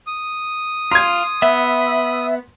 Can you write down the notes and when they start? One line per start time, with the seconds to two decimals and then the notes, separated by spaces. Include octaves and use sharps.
0.07 D#6
0.91 F4 C6 G#6
1.42 B3 E5